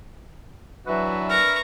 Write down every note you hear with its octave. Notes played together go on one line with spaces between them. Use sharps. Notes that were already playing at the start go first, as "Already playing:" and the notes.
E3 F#3 D4 F#4 B4 E5
A#4 A#5 C#6